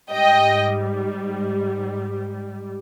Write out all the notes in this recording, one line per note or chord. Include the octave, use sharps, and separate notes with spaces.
G#2 G3 D#5 G5